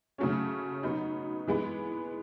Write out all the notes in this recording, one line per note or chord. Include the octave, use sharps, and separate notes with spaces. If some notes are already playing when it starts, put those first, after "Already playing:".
C#3 F#3 A3 C#4
F#3 B3 D#4
E3 G#3 B3